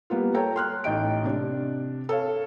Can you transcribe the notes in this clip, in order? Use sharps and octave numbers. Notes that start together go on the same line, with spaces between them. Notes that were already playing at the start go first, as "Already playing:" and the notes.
G3 A#3 B3 F4
A4 C#5 G5 A#5
C6 F6 F#6
A1 D#4 D#5 G5 D7
C3 D4
A4 C#5 F5